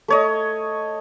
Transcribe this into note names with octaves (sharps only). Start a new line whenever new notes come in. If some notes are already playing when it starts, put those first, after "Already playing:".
A3 C#5 D#5